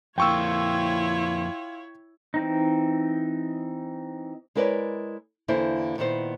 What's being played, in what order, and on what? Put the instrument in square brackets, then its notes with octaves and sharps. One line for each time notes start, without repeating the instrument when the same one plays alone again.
[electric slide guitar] F2 A#3 [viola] E4 C#5 [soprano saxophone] F4 [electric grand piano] G5 C#6 E6
[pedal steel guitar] E3 C4 D#4
[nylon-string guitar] G#3 E4 A#4 B4 C#5 D5
E2 D3 A#3 E4 C5
A#2 D#3 B3 E4 C5